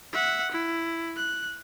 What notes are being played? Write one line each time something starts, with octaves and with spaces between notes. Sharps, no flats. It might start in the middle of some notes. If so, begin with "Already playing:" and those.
E5 F#5
E4
F#6